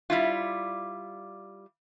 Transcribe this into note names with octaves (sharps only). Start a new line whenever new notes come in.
G3 E4 F4